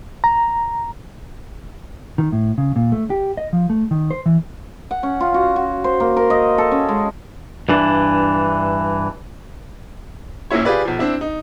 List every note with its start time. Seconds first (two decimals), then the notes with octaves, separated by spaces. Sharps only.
0.24 A#5
2.18 D#3
2.32 A2
2.58 C#3
2.76 A#2
2.92 A3
3.10 G4
3.37 D#5
3.53 F3
3.70 A3
3.91 D#3
4.11 C5
4.26 E3
4.91 F#5
5.03 C#4
5.20 F4
5.34 F#4
5.56 F#4
5.84 C5
6.00 A#3
6.16 A#4
6.30 D#5
6.58 A4
6.71 C#4
6.89 G#3
7.69 G2 E3 D4
10.51 A#1 A#2 C#4 E4 C#5
10.65 F4 G4 G#4 B4 D5
10.85 B1 F3
10.99 C4 D4 E4
11.21 D#4